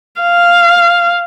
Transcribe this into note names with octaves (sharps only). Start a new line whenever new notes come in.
F5